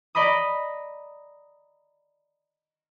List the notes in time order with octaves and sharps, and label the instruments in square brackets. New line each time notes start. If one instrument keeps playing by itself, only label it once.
[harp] D5 D#5 A#5 B5 D#6